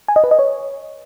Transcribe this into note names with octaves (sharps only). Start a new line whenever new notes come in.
G#5
D#5
B4
D#5
C#5